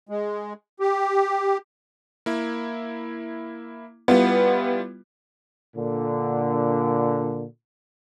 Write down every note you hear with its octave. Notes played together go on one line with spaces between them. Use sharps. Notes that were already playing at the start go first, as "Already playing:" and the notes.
G#3
G4
A#3 E4
G3 B3 E4 F4
A#2 D3